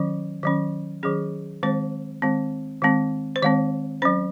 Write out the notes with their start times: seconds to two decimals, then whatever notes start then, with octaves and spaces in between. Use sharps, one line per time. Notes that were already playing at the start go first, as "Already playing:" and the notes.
Already playing: D#3 F#3 C#4
0.43 D#3 F#3 C#4
1.03 D#3 F#3 C#4 G#4
1.63 D#3 G#3 C4 C5
2.22 D#3 G#3 C4
2.82 D#3 G#3 C4
3.36 C5
3.43 D#3 G#3 C4 C#5
4.02 F#3 C#4 C5